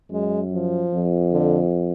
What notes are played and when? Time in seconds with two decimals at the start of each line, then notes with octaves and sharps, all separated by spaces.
0.11 F#2 G#3
0.53 F3
0.93 F2
1.33 D3